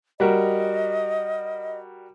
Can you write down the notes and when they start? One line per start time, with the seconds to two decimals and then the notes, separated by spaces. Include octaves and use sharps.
0.20 G3 F#4 A#4 D#5